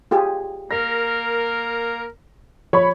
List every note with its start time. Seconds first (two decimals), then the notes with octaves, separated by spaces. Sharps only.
0.11 F4 G4 G#4
0.71 A#3 A#4 A#6
2.73 F3 C#5 B5 C#6